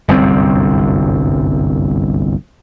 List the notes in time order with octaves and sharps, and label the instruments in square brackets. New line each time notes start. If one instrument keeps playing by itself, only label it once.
[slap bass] G1 C2 F#2 C4